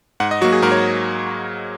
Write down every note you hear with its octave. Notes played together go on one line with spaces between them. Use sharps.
G#2 F#5
D#5
F#3 A#3 F#4
G#4
G#2 A#4
C#5